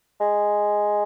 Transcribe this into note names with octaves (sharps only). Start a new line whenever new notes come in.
G#3